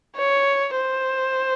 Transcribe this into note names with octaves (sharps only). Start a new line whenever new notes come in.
C#5
C5